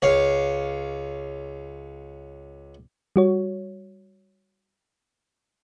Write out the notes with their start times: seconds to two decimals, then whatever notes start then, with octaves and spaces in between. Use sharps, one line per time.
0.02 C#2 C#5 F5
3.16 G3 F#4 C#5